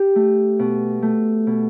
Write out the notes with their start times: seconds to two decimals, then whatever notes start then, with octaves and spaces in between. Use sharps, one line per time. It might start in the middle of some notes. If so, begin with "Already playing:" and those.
Already playing: G4
0.16 A3
0.59 B2
1.02 A3
1.47 B2